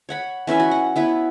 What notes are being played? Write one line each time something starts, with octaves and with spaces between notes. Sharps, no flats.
C#5 F#5 B5
E3 C#4 B4 E5
F#4
F#5
B3 E4 B4 C#5